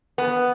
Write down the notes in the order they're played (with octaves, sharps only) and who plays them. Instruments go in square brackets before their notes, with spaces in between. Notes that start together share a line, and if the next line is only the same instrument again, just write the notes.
[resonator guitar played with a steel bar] B3